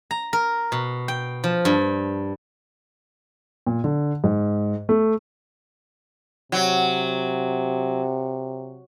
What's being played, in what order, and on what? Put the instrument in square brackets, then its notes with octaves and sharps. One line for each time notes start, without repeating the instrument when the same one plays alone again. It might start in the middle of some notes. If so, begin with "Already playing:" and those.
[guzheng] A#5
A#4
B2
G5
F3
G2
[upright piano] A#2
D3
G#2
A3
[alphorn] C3 [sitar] F#3